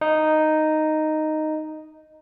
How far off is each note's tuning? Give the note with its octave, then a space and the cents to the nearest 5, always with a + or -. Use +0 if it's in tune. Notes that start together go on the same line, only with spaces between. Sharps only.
D#4 -5